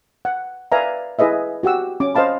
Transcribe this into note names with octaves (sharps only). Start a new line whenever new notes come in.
F#5
B4 D5 E5 F5 G#5 A#5
E4 G#4 B4 D#5 E5
F#4 G4 F#5 E6
C#4 D6
C5 D#5 F5 A5 B5